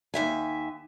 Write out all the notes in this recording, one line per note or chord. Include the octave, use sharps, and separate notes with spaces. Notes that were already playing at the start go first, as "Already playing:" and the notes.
D#2 E5 G#5